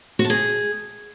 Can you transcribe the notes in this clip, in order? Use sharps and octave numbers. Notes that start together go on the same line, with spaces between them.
F#4
A5
G#4